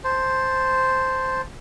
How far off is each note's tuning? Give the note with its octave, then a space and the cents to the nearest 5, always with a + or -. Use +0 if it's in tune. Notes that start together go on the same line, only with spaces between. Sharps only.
C5 +0 A5 +0